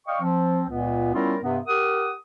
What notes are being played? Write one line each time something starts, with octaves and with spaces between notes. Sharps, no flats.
D5 D#5 F5 G5 C#6
F3 C4
C#2 A#2 B3
G3 B3 C#4 E4 F4 A#4
G2 C3 B3
G4 A#4 F#5 D#6